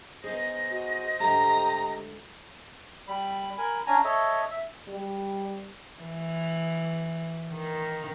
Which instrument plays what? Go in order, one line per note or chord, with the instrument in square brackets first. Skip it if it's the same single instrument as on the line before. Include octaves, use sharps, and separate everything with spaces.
[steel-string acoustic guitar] B3 D#4 G#4 [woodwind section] C5 D#5
[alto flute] F#4
[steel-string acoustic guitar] G#2 D3 A3 [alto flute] G4 [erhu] A#5
[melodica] G3 B5
A#4 G#5 B5
C#4 D4 G#5 A#5
A4 C#5 D#5 E5
E5
[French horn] G3
[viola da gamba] E3
D#3